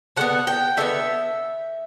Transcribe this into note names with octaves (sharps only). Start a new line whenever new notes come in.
D3 G3 B3 F#5
G5
D3 G3 B3 E5